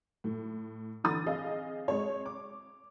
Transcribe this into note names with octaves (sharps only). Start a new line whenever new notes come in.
A2
D3 E3 D#6 A6
C4 G#4 D#5 F5
G#3 C4 C#5
D6